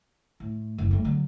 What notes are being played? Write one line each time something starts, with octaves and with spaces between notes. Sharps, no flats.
A2
F#1 D#2
G3 A3
D3 F#3